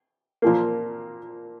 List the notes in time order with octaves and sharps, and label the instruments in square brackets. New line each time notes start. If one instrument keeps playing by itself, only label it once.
[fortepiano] A#2 F3 A#3